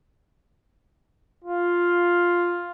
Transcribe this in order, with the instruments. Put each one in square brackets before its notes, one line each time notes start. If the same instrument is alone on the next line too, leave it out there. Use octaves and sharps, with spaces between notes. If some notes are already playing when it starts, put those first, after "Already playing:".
[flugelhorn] F4